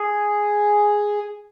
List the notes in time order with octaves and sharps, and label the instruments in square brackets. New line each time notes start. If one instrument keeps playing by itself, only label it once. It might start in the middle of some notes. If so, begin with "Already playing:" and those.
Already playing: [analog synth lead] G#4